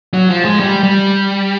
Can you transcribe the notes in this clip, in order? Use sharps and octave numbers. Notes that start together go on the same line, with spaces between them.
F#3
F3
G#3
G3
G3